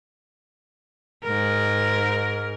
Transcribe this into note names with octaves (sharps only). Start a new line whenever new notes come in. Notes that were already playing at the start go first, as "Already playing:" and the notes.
G#2 A#4